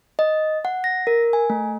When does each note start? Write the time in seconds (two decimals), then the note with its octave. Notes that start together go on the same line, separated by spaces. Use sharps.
0.19 D#5
0.65 F#5
0.84 A#6
1.07 A#4
1.33 G#5
1.50 A3